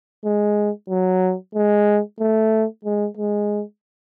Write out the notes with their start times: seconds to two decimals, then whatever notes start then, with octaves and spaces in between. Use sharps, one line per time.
0.25 G#3
0.89 F#3
1.55 G#3
2.20 A3
2.85 G#3
3.17 G#3